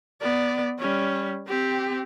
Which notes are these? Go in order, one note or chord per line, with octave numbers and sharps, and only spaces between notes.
B3 D5
G3 C#4
C4 G4